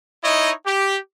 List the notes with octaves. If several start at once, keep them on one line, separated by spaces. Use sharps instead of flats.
D#4 E4 C#5 D#5
G4